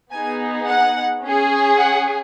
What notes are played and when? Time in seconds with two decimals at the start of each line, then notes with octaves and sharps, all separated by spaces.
0.11 B3 D#4 G#4 G#5
0.68 F#5
1.23 C#4 G#4
1.78 F#5